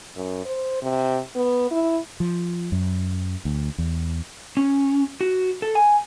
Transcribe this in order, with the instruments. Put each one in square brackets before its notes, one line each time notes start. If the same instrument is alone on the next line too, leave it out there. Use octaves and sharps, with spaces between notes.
[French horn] F#2
C5
C3
B3
E4
[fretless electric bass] F3
F#2
D2
E2
[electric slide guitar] C#4
F#4
A4
G#5